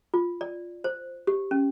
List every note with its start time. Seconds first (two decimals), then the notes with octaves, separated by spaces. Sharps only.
0.14 F4
0.41 D5
0.84 C5
1.27 G4
1.51 C#4